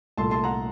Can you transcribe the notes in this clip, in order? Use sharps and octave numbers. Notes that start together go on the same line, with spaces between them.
C2 A#2 A3 A5 C6
A5 C6
F#5 A#5